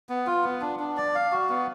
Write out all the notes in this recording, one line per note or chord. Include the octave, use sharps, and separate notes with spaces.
B3
F4
B3
D4
D4
D5
F5
F#4
B3